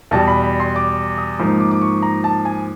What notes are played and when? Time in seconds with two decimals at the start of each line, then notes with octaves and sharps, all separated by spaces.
0.11 E2 B2 G3 A5
0.28 B5
0.44 B5
0.60 C6
0.76 D6
1.18 D#6
1.39 G#2 F3 A#3 D#4
1.60 D6
1.71 D6
1.81 C#6
2.02 A#5
2.24 A5
2.45 G#5